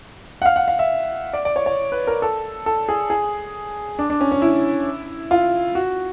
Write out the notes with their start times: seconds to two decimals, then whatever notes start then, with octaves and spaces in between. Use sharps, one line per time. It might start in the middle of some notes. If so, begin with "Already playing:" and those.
0.42 F#5
0.46 F5
0.56 F#5
0.68 F5
0.79 E5
1.33 D5
1.45 D5
1.56 C#5
1.66 C#5
1.92 B4
2.07 A#4
2.22 A4
2.66 A4
2.89 G#4
3.10 G#4
3.99 D4
4.10 D4
4.21 C#4
4.32 C#4
4.42 E4
5.31 F4
5.75 F#4